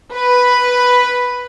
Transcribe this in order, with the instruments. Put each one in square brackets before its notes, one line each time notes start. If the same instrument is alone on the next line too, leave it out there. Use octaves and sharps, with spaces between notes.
[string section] B4